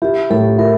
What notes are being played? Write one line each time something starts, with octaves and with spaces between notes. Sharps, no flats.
E4 G4
A2 A4
E4 A#4